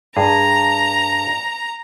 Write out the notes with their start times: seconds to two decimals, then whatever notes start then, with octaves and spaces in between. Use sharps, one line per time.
0.16 G2 G#4 A#5